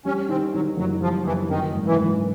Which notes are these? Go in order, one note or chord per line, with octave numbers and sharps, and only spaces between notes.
G3 C#4
D#3 C4
D#3 F#3
F#1 F#3
F3 G3
F#1 E3
F#2 D#3
G#1
E3
G#1